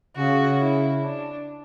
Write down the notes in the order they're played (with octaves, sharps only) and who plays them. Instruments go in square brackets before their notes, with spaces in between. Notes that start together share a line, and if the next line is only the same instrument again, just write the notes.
[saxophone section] C#3 [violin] F#4
[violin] E4
D4